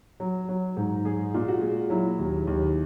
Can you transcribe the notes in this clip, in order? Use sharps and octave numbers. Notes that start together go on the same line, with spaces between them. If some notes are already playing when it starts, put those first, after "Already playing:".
F#3
F#3
G#2
G#3 G#4
A#2
F#4
G#3
F#3 E4
D#2
D#2